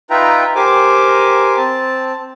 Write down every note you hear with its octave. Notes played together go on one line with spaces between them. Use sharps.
D#4 F4 B4 E5 G5 A#5
G4 A#4 C5 G#5 D6
C4 A5